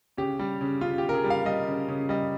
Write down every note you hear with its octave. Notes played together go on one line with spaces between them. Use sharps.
C#3 G4
G3
C#3
C#3 F4
G4
C#3
A#4
G#4
G3
F5
G3 D#5
C#3
C#3
G3 D#5